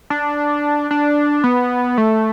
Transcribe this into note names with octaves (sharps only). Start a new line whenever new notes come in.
D4
D4
B3
A3